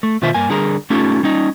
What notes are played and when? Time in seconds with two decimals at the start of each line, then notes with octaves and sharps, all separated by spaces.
0.03 A3
0.22 B2 D#3 F4 C5 E5
0.34 G2 A#3 G#5
0.50 D3 G3 G#4 A#4 A#5
0.90 A3 C#4 D#4 F4 G4 A4
1.23 G3 C#4 D#4